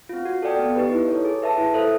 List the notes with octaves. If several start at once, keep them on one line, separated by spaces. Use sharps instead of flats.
C4 F4
F#4
A4 D5 G5
B3
D#4 G4 B4
E4
A4 C#5
G#4
B4 E5 A5
E4
A4 C5 E5